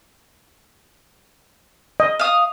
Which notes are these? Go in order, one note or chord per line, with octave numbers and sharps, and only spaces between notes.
D#5
F5 D#6